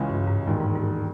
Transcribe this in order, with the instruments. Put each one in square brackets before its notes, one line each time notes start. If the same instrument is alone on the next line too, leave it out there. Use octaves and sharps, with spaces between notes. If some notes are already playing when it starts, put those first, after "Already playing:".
Already playing: [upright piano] C#2 C#3 E3 G#3 C#4
[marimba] G2
G#2
[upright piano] E1 D#2 D#3 G#3 [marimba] A2
[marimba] G#2
G#2